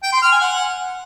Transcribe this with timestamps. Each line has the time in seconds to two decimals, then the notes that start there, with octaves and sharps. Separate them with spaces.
0.03 G5
0.13 C6
0.22 F6
0.32 G#5
0.41 F#5